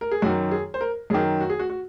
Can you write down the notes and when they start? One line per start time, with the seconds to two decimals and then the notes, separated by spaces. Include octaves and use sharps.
0.01 A#4
0.11 G#4
0.22 F#2 D#3 F#4
0.51 G#4
0.74 C5
0.81 A#4
1.10 F#2 D#3 G#4
1.41 F#4
1.50 G#4
1.59 F#4
1.70 F#4